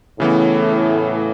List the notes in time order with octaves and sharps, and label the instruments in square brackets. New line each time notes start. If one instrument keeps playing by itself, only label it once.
[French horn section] A2 [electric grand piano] C#3 E3 B3